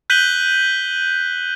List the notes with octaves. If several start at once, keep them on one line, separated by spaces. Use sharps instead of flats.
F#6 G6 B6 D#7 F#7 G7